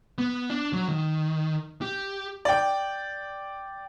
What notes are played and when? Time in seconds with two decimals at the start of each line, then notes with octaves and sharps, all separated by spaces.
0.18 B3
0.50 D4
0.73 F#3
0.89 D#3
1.82 G4
2.45 D5 G5